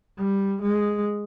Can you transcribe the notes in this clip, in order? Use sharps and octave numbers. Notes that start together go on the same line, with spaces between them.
G3
G#3